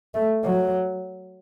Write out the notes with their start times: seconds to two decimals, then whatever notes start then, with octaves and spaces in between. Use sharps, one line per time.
0.14 A3
0.45 F#3